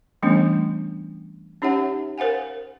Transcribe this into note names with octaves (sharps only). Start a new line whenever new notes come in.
E3 G3 A3 B3 C#4 D4
C#4 D#4 G4 C#5 E5 F#5
A#4 C5 F5 F#5 G#5